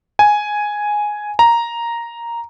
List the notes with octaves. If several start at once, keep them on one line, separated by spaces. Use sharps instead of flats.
G#5
A#5